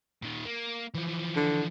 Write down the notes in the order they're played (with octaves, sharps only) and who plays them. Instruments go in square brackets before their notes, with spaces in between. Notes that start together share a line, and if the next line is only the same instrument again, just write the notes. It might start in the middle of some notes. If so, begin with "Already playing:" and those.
[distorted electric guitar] A#2 D#3
A#3
E3 F3
[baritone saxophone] D3